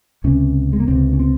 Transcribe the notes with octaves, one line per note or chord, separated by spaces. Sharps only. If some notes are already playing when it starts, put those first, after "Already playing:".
C#2 C3 C#4
G#3
A#3
C#2 C3 C4
C#4
C4